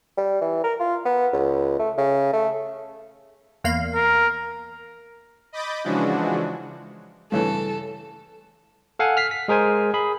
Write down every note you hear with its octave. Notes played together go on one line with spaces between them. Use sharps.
G3
E3
A#4
F4
B3
C#2
A3
C#3
A3
E2 A#3 F5
A#4
D#5 B5 D6 G6 A6
C#3 E3 F3 G#3 D4 F#4
G2 C#3 E3 A4
A4 F5 F#5 G#5
F6 B6 C7
B6
G#3 G#4 A#4 C5 G#5
G#4 B5